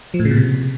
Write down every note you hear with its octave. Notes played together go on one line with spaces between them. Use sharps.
F3
A2
C#3
A#2
C3